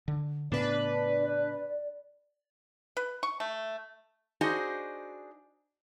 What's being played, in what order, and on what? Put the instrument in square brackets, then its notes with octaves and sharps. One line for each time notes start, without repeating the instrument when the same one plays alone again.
[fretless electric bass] D3
[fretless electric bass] A2 C#3 B3 [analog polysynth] D4 B4 [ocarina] D5
[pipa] B4
C#6
A3
[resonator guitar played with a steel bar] D4 D#4 F#4 G#4 C5 D#5